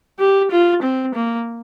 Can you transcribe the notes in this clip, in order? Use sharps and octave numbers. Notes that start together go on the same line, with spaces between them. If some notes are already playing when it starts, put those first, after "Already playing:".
G4
F4
C4
A#3